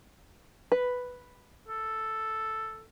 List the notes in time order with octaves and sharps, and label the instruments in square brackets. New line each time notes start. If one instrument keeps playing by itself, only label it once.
[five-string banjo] B4
[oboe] A4